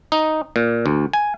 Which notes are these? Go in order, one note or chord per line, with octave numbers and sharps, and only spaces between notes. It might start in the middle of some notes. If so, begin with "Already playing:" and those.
D#4
A#2
D2
G#5